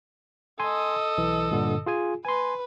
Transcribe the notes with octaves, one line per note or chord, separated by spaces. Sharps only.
A4 D#5 G#5 C6
B1 E3
G2 A#2 D3
F4 G#4 G#5
B4 G#5 C6